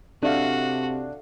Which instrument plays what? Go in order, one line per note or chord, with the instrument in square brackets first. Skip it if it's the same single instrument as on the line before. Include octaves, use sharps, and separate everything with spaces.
[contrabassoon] C3 [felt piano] D4 [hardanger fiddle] F#4 [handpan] A4 E5 F5